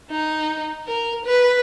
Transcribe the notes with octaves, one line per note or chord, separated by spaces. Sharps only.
D#4
A#4
B4